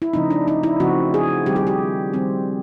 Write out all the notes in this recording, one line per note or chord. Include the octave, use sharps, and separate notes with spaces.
E4
C#3 F3 A3 C4 D#4
D4
D#4
E4
C#3 F3 A3 C4 F#4
G#4
D#3 G3 C4 G4
G#4
G4
D#3 G3 C4